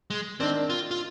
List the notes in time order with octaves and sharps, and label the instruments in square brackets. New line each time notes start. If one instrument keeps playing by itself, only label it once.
[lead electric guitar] G#3
[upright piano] D#3 A#3 D4 [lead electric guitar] C4
[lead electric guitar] F4
F4